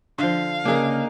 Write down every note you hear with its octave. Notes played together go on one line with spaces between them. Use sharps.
D3 F3 F5
C#3 A#3 D4 D#4 G#4 A#4